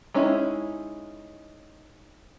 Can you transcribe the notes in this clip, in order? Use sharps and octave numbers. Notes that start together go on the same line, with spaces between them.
G#3 C#4 D#4 E4